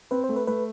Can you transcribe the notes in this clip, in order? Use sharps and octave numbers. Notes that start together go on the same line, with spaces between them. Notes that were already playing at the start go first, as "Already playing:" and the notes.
C4 B4
C5
A3
B4
A3 B4